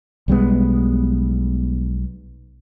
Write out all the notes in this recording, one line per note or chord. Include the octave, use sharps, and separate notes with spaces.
B1 G3 G#3 B3